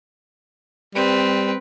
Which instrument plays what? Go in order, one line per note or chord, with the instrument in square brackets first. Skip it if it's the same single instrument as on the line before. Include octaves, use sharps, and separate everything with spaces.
[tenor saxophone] G3 [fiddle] C4 B4